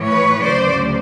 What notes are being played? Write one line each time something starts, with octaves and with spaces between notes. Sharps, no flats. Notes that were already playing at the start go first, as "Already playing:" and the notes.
Already playing: A2 E3
B4 C#5
D2 C#3 F#3 C5 D5